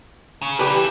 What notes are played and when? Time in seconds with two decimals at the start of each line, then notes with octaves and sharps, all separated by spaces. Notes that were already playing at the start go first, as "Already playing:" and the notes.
0.42 C#3
0.59 A#3 D4 G4 B4
0.75 E3